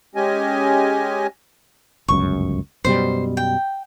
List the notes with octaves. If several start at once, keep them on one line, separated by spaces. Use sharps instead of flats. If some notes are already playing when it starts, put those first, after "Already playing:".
G#3 C#4 G4 D#5 G#5
G1 C#2 F#2 C#6
F#2 B2 G3 C5
G5